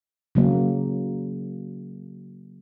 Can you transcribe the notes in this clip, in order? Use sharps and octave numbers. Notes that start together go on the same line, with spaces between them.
C#3 F#3 A#3